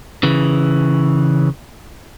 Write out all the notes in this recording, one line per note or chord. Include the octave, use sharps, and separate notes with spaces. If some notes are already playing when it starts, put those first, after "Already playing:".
C#3 E3